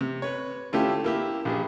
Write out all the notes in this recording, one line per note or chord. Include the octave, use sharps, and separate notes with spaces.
C3
B4 C#5
D3 A3 C#4 E4 F4 G4
A#3 E4 G4
A#1 G4 G#4